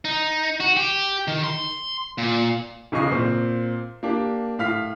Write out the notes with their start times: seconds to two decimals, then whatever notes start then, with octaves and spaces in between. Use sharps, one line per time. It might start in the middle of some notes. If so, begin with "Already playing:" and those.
0.05 D#4
0.60 F#4
0.77 G4
1.28 D#3
1.44 C6
2.18 A#2
2.92 E1 B1 C#3 D#5 C#6 C7
3.11 A#2 C4
4.03 A#3 D4 G4
4.59 A2 F5 F6 B6